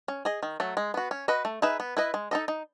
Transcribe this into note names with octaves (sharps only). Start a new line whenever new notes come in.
C#4
G#4 D#5
D#3
F#3 A3
G#3
B3 F#4
C#4
F#4 B4 D#5
A3
D#4 G#4 B4 E5
B3
E4 B4 D#5
G#3
D#4 A4 D#5
D#4